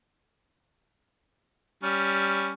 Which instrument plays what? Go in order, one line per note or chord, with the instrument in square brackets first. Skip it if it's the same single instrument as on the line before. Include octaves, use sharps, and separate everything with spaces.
[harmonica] G3 C#4